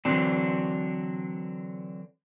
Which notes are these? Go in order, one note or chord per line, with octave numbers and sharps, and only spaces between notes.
D3 E3 F#3 C4 D4